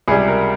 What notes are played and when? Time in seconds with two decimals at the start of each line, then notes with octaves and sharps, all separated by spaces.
0.08 C#2 C3 G3 G#4
0.28 A#4